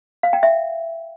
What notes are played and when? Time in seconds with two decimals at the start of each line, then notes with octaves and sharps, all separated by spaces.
0.23 F5
0.33 G5
0.43 E5